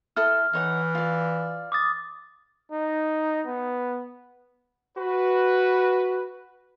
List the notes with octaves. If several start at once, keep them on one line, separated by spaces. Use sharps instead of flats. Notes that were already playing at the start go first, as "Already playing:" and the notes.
E4 A4 D#6 F6
E3 D#4 C#5 F#5
F4 D5
D6 D#6 A6
D#4
B3
F#4 B4